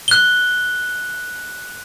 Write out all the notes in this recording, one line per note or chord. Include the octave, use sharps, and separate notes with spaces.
F#6 G7